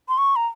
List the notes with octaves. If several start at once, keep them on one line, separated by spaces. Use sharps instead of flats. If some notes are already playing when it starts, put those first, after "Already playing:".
C6
C#6
A#5